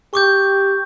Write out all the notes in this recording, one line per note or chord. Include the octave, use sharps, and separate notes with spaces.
G4 C#6 D6 G6